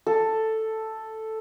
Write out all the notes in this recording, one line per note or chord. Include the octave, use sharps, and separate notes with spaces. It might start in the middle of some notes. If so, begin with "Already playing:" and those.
A4